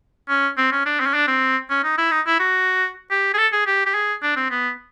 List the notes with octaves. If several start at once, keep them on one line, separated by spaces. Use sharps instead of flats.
C#4
C4
C#4
D4
C4
C#4
D4
C4
C#4
D#4
E4
D#4
E4
F#4
G4
G#4
A4
G#4
G4
G4
G#4
D4
C4
B3